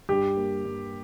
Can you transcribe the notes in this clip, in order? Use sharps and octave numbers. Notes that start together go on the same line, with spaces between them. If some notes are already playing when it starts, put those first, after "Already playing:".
G2 G4
A#3
G2